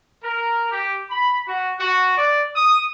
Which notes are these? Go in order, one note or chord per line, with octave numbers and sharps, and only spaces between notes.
A#4
G4
B5
F#4
F#4
D5
D#6